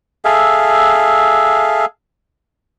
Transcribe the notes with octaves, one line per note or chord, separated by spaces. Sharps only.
G#4 A4 E5 F5